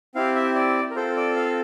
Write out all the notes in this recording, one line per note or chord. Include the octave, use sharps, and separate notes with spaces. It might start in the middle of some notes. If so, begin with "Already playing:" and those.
C4 E4 G4 F5
E5
D5
A#4
C4 F4 A4 C5
D5
F5